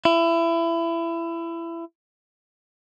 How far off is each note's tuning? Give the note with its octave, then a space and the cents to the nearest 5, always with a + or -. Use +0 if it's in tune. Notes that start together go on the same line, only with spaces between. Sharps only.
E4 +25